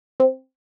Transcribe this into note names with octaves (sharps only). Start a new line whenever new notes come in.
C4